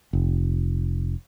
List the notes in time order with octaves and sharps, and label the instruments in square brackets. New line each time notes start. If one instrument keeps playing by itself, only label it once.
[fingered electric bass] F1